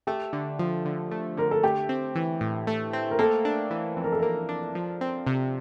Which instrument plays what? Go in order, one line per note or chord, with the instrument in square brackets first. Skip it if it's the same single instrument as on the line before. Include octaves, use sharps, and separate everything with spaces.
[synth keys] A3 [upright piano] G4
[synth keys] D3
F3
D3
A3
[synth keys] D3 [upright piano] A#4
[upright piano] A4
[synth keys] A3 [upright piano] G4
[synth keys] C4
E3
A2
A3
C4
[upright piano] A#4
[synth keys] A#3 [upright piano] A4
[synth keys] D4
E3
F2
[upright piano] A#4
A4
[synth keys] A#3 [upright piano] A#4
[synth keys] D4
F3
C4
C3